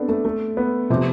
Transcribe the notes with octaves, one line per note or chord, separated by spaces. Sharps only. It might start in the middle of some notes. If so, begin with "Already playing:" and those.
Already playing: B3 C4 D4 A4
A3
A3
B3
C3 F3 C4 G4